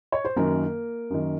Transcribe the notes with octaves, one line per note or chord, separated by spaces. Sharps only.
C#5
C5
F#2 D#3 A#3 A#4
F#2 D#3